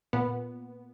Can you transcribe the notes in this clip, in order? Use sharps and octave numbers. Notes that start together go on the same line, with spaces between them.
A#2 B3